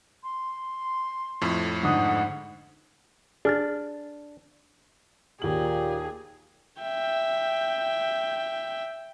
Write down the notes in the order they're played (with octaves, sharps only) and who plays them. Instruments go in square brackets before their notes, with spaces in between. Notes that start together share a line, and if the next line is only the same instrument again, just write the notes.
[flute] C6
[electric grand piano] F2 A2
[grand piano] G#2 D3 D#6 [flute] F#5
[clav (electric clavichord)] D4 [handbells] G#4 F6 A6
[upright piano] D#2 F#7 [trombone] A#2 [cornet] G4 [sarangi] G#4
[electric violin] E5 G5